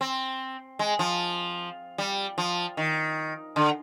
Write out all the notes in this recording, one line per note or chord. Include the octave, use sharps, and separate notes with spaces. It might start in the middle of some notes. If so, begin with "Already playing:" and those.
C4
G#3
F3
G3
F3
D#3
D3